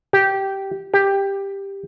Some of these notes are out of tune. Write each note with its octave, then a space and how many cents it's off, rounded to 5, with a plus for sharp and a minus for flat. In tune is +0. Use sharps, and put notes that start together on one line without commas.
G4 -10
G4 +10